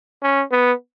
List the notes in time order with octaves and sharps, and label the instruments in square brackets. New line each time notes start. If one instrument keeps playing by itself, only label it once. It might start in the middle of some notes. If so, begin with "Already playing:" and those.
[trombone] C#4
B3